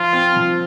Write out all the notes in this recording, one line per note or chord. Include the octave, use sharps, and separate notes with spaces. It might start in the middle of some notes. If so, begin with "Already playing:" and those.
Already playing: F3 F4
C4
F3